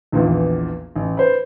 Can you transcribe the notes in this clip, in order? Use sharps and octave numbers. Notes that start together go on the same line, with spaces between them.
A#1 E2 A#2 D#3 E3
A1
B4 C5